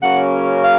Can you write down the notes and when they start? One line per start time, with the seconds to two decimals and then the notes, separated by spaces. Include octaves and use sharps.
0.01 C#3 F#3 A#3 C#4 F#5
0.63 F5